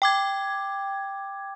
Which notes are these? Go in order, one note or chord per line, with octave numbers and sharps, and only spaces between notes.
G5 D6 G#6